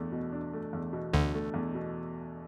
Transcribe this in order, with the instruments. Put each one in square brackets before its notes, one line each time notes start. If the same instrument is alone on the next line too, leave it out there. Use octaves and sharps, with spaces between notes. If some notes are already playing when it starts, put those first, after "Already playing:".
Already playing: [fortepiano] E2 A3 D4
B2
D4
A3
E2
B2
[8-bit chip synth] D2 D3 [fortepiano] D4
[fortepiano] A3
E2
B2